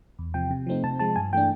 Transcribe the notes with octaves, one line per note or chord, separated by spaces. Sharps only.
E2
C3 F3 G5
C3
F3 A3 C4 D#4
C3 A5
F3 G#3 A5
G2 G#5
E3 A3 D4 G5